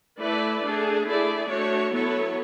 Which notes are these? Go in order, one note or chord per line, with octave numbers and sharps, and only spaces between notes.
A3 E4 B4 D5
A3 D4 G#4
A3 E4 G#4 D5
A3 D4 F#4 C#5
F#3 B3 E4 A4 C#5